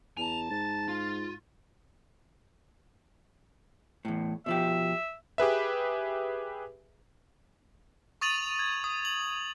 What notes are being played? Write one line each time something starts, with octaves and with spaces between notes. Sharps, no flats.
E2 G#5 A5 F7
G#2 A6
F4
E2 A2
B2 F3 G4 E5
G4 G#4 B4 E5
C#6 D#6 A6 D#7 F7 F#7
G#6
D#6
F#7